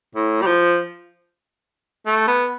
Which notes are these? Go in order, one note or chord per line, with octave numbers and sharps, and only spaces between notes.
A2
G3
F3
A3
B3